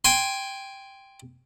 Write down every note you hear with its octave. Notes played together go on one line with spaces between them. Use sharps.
G5 G#5 C6